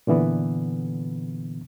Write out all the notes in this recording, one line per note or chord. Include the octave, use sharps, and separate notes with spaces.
A#2 D3 E3 B3